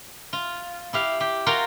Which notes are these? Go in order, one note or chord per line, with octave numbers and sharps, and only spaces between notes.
F4
E4 G4 F5
G4
F4 F#4 A#4 F5 G5